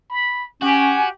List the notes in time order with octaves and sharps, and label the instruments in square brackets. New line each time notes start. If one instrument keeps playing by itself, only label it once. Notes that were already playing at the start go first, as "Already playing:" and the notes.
[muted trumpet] B5
[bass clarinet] C#4 [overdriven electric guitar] F#4 [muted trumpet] G4 [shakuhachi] G#5